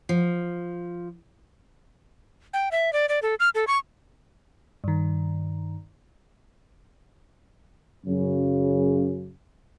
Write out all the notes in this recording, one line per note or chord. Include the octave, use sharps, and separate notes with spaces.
F3
G5
E5
D5
D5
A4
F6
A4
C#6
G2 D#3
F#2 C#3